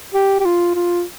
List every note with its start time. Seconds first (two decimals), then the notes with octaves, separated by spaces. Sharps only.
0.14 G4
0.40 G4
0.45 F4
0.75 F4